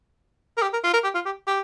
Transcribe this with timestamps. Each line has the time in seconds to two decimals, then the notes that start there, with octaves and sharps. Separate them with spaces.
0.57 A#4
0.62 G4
0.73 A#4
0.84 F4
0.93 A#4
1.04 G4
1.14 F4
1.26 G4
1.47 G4